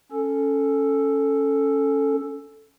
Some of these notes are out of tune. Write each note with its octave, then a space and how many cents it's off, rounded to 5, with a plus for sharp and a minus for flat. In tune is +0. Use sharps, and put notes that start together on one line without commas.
C#4 +0 A4 +0